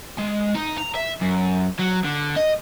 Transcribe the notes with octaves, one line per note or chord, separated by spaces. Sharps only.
G#3
D#4
A#5
E5
F#2
F#3
D3
D#5